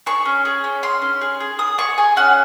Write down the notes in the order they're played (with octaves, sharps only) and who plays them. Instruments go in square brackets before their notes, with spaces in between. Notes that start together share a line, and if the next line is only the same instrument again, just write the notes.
[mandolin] G#4 C#6
C#4
G#4
C#4
C#4 C6
C#4
G#4
G#4
G#4 D#6
G#4 C#6
G#4 G#5
C#4 F#5